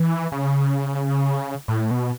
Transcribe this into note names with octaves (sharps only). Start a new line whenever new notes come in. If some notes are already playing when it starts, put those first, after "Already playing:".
Already playing: E3
C#3
A2
B2